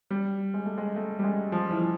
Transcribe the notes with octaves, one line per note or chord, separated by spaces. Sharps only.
G3
G#3
A3
G#3
A3
G3
G#3
F3
E3
F3